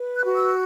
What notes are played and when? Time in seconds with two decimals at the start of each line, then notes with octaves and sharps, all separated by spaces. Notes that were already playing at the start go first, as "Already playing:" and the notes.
Already playing: B4
0.15 F#6
0.25 F#4
0.35 E6